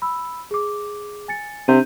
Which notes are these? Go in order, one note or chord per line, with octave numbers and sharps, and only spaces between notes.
B5 E6
G#4 D6
G#5 A6 C#7
C3 D4 G6 D#7